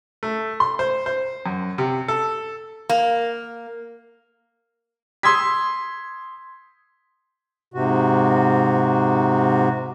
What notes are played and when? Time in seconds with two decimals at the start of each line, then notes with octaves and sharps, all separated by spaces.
0.23 A3
0.60 C6
0.79 C5
1.06 C5
1.46 F#2
1.78 C3
2.08 A4
2.89 A#3
5.23 C6 D#6 E6 G#6 B6
7.74 G#2 C3 F#4